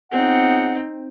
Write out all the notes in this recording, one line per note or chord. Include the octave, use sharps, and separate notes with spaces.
C#2 B3 C4 D#4 F#5